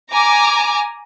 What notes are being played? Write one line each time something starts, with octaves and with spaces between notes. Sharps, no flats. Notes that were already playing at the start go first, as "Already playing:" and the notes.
G#5 A#5 D6